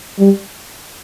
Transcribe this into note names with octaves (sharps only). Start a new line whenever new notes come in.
G3